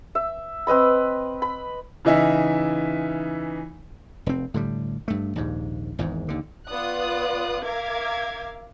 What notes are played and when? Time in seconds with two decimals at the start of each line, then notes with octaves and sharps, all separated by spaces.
0.15 E5
0.67 C4 B4 D#5 B5
1.42 B5
2.05 C#3 E3 D#4 E5
4.26 F1 C4
4.54 A2 D3 G3
5.08 G2 A3
5.35 A#1 D#2 G#2
5.99 G#1 E2 G#2
6.28 D#2 D3
6.68 B3 F4 D5 D#6 F#6
7.62 A#4 E5 F5 D6 G#6